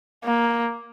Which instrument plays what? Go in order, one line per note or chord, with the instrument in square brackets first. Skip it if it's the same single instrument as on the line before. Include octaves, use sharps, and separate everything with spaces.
[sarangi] A#3